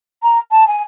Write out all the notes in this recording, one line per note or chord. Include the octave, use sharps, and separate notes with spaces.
A#5
A5
G#5